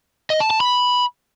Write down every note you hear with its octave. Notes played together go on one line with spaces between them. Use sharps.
D#5
A5
A5
B5